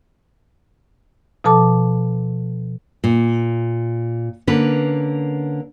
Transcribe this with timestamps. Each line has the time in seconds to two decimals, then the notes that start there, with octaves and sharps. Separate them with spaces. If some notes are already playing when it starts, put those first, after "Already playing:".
1.44 B2 F3 A4 A5 D6
3.04 A#2
4.47 D3 A#3 C#4 B4